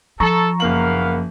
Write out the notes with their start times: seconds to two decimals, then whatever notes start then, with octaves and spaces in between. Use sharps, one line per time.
0.20 F3 A4 A#5 C#6
0.60 F#1 A#3 B3 A#4 F5 F#7